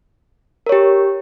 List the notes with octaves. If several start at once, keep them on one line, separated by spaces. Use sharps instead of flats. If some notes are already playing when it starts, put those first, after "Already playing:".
G4 A#4 C#5